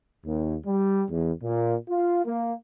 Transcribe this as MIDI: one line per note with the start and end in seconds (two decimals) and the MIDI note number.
0.25 0.56 39
0.66 1.03 55
1.10 1.31 40
1.43 1.75 46
1.89 2.24 65
2.25 2.54 58